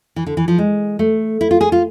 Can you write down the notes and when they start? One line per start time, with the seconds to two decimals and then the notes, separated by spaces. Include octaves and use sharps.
0.16 E3
0.26 D3
0.37 E3
0.48 F3
0.58 G#3
0.99 A3
1.41 E4
1.51 F4
1.61 G#4
1.72 F4